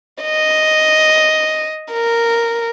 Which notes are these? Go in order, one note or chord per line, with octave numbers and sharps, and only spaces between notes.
D#5
A#4